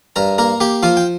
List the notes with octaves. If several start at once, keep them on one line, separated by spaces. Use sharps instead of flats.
G2 A#4 A#5
A#3 A#4 A#5
A#3 G4 G5
F3 F4 F5
G5